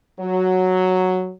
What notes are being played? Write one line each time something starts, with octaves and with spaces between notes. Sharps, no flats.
F#3